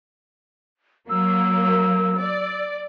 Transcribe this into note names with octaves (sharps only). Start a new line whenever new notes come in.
F#3 A#3 E6
D5